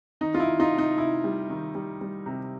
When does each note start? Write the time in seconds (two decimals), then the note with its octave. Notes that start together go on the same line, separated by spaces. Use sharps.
0.21 D#3 D#4
0.34 F4
0.40 E4
0.46 D#3
0.60 D#4 F4
0.72 C3
0.78 D#4
0.98 C3 E4
1.24 G3
1.50 D#3
1.75 G3
2.01 G3
2.26 C3